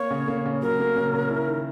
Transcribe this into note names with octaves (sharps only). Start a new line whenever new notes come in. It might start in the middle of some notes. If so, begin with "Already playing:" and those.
Already playing: A#3 C#5
C#3
A#3
C#3
F#3 A#4
A#3
C#3
C#3
E4
D#3